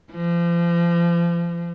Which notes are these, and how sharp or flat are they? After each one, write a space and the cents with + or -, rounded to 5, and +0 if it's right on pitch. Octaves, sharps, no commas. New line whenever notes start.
F3 -35